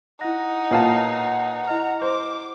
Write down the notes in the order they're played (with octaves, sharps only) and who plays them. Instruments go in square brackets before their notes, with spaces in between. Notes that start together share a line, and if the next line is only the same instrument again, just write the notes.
[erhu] D#4 [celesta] E4 A#6 [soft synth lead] F#5
[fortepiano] A#2 F5 A5 [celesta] B4 C#5
[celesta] E4 D#5 F6 [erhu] A#5
[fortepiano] C5 [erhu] D6